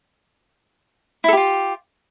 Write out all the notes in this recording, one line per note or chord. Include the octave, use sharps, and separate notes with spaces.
E4 F4 G4 A4